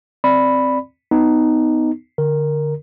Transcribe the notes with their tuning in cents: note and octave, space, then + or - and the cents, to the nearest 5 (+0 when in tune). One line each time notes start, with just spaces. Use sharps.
C4 +0 D5 +0 B5 +0
B3 +20 D#4 +0
D3 +0 A#4 +0